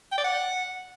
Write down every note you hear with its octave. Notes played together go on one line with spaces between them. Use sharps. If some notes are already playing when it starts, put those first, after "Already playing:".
G5
D5
F#5